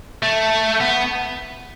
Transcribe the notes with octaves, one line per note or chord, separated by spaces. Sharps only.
A3
B3